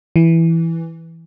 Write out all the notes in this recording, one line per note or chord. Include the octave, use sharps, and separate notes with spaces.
E3